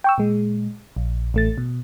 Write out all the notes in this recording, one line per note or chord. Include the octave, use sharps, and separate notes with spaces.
G5 C#6 E6
A#2 G#3
A#1
A1 A3 A6
B2